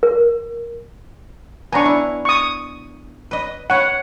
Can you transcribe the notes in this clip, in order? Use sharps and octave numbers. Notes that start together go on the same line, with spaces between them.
A#4
B3 D4 G#5 A#5 C#6
E4
C#6 D#6
B4 D#5
B4 C#5 F#5